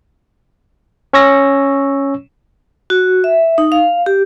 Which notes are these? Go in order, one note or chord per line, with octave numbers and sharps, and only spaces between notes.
C#4 C#5 C#6 E6 A#6
F#4
E5
D#4
F5
G4